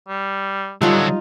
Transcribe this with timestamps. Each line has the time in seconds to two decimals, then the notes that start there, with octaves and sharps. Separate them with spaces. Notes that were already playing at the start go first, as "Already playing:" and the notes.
0.08 G3
0.82 D3 F#3 G3 D#4 F4 A4